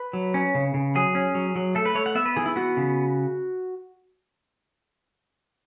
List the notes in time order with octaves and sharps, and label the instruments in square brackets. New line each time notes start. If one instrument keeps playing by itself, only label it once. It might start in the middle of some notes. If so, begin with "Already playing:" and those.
Already playing: [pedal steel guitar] B4
F#3
C#4
C#3
C#3
F#3 G#4
C#4
F#3
F#3
A3 A4
B4
A3 C#5
F#5
B3 E5
B4
E3 G#4
E4
B3 F#4
C#3